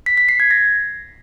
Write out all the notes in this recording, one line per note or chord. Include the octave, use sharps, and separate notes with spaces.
B6
B6
C7
G#6
A#6